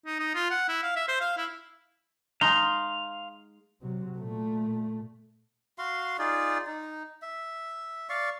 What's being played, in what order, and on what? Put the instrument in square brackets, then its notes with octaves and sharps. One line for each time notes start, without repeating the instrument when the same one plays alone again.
[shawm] D#4
D#4
F4
F#5
E4
F5
E5
C5
F5
E4
[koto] G#3 D#4 [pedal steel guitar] F5 C6
[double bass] C3 F#3
A#2 A3
[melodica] F#4 F5 C6
D#4 F4 G#4 D5
D#4
E5
D5 F5 C#6